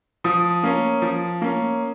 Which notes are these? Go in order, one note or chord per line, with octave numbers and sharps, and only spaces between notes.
F3 D#6
A#3 C#4
F3
A#3 C#4